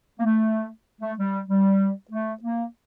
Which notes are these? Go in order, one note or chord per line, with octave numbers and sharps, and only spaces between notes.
A#3
A3
A3
G3
G3
A3
A#3